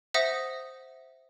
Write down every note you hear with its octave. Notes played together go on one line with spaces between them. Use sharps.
C5 E5 F#5 D#6 A#6